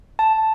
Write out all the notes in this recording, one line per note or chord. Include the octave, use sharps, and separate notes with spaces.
A5